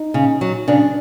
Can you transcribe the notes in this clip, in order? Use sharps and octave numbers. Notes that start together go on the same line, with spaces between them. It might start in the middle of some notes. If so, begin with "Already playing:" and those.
Already playing: D#4
C#3
F#3
C#3 D4